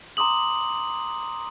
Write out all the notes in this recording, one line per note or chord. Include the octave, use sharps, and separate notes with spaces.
A#5 C6 D6 D#6 F#7